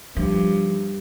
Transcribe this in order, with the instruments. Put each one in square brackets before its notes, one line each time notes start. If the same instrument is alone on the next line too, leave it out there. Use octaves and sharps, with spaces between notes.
[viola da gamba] G2 [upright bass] F3